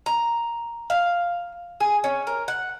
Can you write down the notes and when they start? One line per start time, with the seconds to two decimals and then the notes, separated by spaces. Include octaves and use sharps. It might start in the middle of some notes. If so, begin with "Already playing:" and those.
0.06 A#5
0.90 F5
1.80 G#4
2.04 C#4
2.27 A#4
2.48 F#5